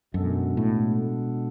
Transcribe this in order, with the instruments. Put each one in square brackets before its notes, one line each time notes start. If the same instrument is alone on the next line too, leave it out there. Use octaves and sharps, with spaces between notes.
[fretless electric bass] F#2 [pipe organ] B2 G#3 B3 D4 A4
[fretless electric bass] A2